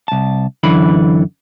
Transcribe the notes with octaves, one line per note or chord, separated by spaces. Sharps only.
C2 A5
F#2 D3 E3 B5